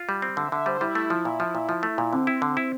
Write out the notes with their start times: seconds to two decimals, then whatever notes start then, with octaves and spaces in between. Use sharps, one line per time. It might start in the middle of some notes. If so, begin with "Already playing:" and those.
Already playing: F4
0.09 G3
0.22 C4
0.37 D3 E5
0.52 D3 E5
0.66 G3 C5
0.81 G3 E4
0.95 A3
1.10 F3
1.25 A#2
1.40 F3
1.55 A#2
1.69 F3
1.83 A3
1.98 A#2
2.13 D3 C4
2.27 E4
2.42 D3
2.57 E4